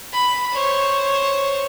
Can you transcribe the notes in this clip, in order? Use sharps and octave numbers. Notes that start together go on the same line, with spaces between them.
B5
C5 C#5